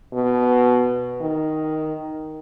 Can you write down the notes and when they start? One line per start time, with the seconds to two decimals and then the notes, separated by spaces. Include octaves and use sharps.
0.14 B2
1.21 D#3